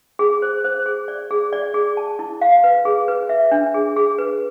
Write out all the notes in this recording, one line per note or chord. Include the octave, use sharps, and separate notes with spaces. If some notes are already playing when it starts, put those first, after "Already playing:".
G#4
C5
C5
G#4
D5
G#4
D5
G#4
A5
E4
F5
B4
G#4
B4
E5
D4
G#4
G#4
B4